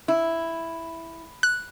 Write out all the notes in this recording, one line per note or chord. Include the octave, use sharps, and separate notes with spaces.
E4
F#6